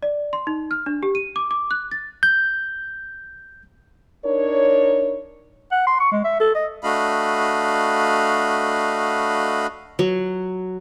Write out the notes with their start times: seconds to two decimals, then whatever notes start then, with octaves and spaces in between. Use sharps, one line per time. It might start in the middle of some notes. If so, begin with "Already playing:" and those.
0.03 D5
0.33 C6
0.47 D#4
0.71 F6
0.86 D4
1.03 G4
1.15 D#7
1.36 D6
1.51 D6
1.71 F#6
1.91 A6
2.23 G6
4.25 D4 D#4 A#4 C#5
5.72 F#5
5.87 C6
6.00 C#6
6.12 G#3
6.24 E5
6.40 A4
6.55 D#5
6.82 A3 D4 F#4 D#5 F5 B5
9.99 F#3